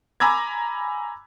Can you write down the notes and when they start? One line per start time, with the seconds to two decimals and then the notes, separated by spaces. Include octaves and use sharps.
0.20 G#5 A#5 B5 D6 E6 G#6